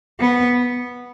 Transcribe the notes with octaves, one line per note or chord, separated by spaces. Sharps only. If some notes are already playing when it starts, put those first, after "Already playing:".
B3